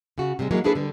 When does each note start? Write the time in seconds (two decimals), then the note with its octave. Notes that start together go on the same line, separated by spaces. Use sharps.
0.18 C#3 F#4
0.39 C3 F3 G3 G#3
0.51 E3 F#3 G#3 A#3 E4
0.64 A#3 D4 E4 G#4 A4 B4
0.75 D3 G3